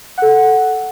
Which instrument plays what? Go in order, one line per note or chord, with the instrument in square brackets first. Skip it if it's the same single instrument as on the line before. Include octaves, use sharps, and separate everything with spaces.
[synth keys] A4 F#5